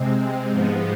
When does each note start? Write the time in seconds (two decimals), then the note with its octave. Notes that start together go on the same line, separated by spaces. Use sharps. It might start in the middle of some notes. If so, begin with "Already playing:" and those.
Already playing: C3 G#3 C4
0.49 G#2 F3 G#3 B3